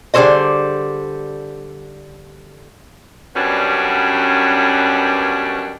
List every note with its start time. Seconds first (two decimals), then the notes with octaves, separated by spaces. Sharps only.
0.14 D3 G3 G#4 A4 C5 D#5
3.35 F#2 B2 G3 B3 C#4 D4